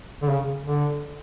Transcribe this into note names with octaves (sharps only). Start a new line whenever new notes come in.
D3
C#3
D3